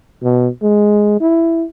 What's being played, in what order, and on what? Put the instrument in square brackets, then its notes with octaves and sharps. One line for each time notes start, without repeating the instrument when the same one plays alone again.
[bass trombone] B2
G#3
E4